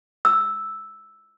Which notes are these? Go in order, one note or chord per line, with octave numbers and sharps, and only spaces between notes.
E6